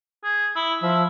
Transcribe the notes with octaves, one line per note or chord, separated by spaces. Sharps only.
G#4
E4
F3 E5